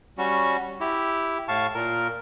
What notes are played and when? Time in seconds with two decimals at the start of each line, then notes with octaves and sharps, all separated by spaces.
0.18 G3 C#4 F#4
0.80 E4 G4
1.48 A2 F5 A5 C#6
1.74 A#2 A#4